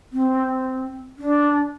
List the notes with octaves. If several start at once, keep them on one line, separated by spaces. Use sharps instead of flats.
C4
D4